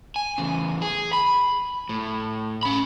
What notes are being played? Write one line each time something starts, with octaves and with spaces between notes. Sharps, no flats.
G#5
E2 C#3
G#4
B5
A2
C#4 B5